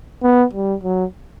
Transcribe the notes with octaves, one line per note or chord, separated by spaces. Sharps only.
B3
G3
F#3